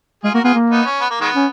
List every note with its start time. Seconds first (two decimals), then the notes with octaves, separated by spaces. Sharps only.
0.24 G#3 F4 G#4
0.34 A#3 F#4 A#4
0.44 B3 F4 G#4
0.54 A#3
0.70 B3 D#4
0.85 C#4
1.01 B3
1.10 A#3
1.21 D#3 G#3 B3
1.35 C#4